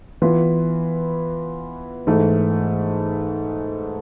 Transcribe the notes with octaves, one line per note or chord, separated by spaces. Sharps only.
E3 B3 F4 B4
G#2 E3 A3